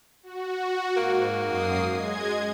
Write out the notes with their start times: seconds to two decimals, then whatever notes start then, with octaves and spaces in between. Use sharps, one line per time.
0.23 F#4
0.97 G#2 A#3
1.44 F#2 D#6 C7
1.93 G#3 D#5 G#6